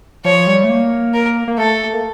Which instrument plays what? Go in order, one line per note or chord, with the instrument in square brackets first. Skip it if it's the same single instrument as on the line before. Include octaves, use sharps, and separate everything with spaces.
[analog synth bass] F3 [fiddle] C#5
[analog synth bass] G3
A3
A#3
[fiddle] A#4
[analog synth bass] A#3
[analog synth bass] A3 [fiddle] A4
[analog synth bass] A#3